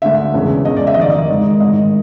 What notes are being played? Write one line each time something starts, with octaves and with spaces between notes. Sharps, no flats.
D2 D3 E5
E1 E2 C#3 E3
E1 E2 C#3 D#5
D5
E5
D#5
F1 D#2 D#3 D5
D#5
G#1 G#2 D#3
A1 G#2 D#3 D#5